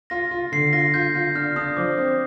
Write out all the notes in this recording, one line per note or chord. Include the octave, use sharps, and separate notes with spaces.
F4 A#6
F4
D3 C7
F4 A#6
F4 G6
F4
D4 F6
D4 D#6
F3 D6
C4